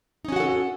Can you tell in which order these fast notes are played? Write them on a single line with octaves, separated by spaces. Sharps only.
D#4 C#4 F#4 F#5 A4